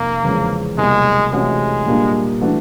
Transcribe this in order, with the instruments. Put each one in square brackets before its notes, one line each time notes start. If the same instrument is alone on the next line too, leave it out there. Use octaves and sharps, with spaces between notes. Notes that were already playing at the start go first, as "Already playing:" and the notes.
Already playing: [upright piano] F1 [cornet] A#3
[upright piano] E2 C#3 F3 G#3 C#4
[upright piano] C2 B2 F#3 A#3 [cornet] G#3
[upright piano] C3 E3 A3 C#4 F#4 [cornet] G#3
[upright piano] A#2 G3 A#3 D4 F4
E3 A3 D4 F#4